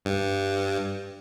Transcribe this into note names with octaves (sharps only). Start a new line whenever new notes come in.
G2